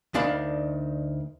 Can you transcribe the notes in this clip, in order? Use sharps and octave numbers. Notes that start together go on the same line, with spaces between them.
D2 D#3 D4 F5 B5